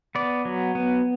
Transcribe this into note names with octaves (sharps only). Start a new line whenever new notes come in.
B3 D5
F#3
B3